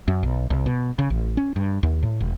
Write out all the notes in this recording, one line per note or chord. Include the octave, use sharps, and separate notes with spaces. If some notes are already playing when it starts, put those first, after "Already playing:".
F#2
B1
C2
B2
C#3
A1
C#4
G2
D#2
A2
E1